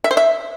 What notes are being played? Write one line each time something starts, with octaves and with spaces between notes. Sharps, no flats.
E5
C5
E5